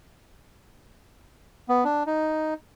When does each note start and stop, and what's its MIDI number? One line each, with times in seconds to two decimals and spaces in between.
1.69 1.84 59
1.84 2.03 62
2.07 2.54 63